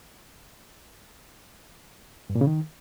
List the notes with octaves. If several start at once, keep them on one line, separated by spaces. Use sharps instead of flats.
G2
A#2
C#3
D#3